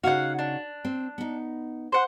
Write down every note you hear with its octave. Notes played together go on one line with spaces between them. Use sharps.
C#3 D#4 F#4 F5 F#5
D4
C4
B3 D#4
C5 F#5